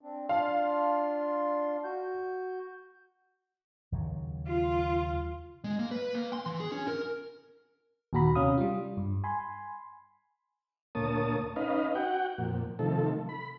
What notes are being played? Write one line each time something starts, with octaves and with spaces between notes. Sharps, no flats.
C4 D4
D4 F4 F5 C6
F#4 G6
D#2 C#3 F#3
F4
G#3
A#3
B4
A#3
C6
E3
G#4
C#4
A#4
D#2 A#2 F#4 A#5 B5
C3 C#4 F5 D#6
G3 F4
G2
G#5 B5 C6
D2 A#2 A#3 C#5 A5 D#6
C#4 D#4 B4 D#5 F5
F#4 F#5 G5
F2 A#2
C3 D#3 F3 A3 A4
B5